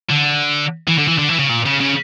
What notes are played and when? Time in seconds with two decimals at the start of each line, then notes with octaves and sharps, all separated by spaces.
0.09 D3
0.88 E3
0.98 D3
1.08 E3
1.18 D3
1.29 E3
1.39 C#3
1.49 A#2
1.66 C#3
1.81 C#3